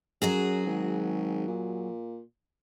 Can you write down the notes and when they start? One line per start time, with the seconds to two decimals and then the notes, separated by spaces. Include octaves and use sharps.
0.22 F#2 F#3 F#4 G#4
0.67 G#1
1.47 A#2